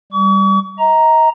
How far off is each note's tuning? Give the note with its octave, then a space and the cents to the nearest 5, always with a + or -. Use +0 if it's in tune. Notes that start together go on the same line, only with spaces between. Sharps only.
G3 +0 C#6 +45
D#5 +35 A#5 +0